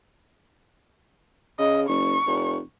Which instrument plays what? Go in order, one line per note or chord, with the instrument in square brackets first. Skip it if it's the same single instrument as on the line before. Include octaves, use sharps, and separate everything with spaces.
[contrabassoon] C#3 [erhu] D#5
[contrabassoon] F#1 [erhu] C#6
[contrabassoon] F1